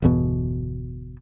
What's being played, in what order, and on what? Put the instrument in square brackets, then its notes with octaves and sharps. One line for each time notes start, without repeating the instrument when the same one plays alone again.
[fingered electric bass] G1 E2 B2